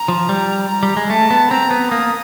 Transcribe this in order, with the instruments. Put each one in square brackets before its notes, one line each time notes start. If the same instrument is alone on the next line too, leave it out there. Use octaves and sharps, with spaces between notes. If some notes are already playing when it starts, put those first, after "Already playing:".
Already playing: [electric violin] A#5
[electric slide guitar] F3
G3
[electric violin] A#5
[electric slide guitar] G3
G#3
[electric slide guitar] A3 [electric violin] A5
[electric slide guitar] B3
[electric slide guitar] C4 [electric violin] A#5
[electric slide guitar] B3
[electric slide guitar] A#3 [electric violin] D#6